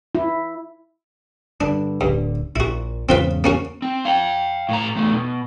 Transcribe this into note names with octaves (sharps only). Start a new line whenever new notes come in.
E4
G2 D3 D4
D1 B1 G2 D3
A#1 A#2 E4 F#4
E2 G#2 C#3 C4 F4 B4
A#3 C#4 F#4
C4
F5 G5
A2 A#5
E2 A3
B2